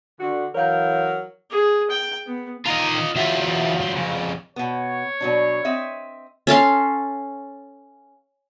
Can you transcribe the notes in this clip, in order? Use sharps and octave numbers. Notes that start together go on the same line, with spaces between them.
D3 F#4
E3 F#3 A#4 C#5 F5 G6
G#4
G5
B3
D#3 F4 D#5 A#5
E2 F#3 F4 E5
G2 C6
F2 C#3
B2 B3 C#5
B2 F#3 D4
C4 D#5 E5
C#4 A4 F5 C6